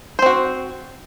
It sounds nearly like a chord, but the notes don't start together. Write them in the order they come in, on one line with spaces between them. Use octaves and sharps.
C5 C4 F#4